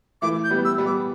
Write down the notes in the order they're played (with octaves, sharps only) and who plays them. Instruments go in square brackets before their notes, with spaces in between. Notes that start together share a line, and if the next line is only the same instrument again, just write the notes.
[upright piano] E3 A3 [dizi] D6
[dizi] G6
[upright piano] G3 B3
[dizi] E6
[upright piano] G3 B3
[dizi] D6